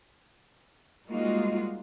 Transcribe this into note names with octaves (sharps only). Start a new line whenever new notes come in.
G3 G#3 A#3 D#4 F4 F#4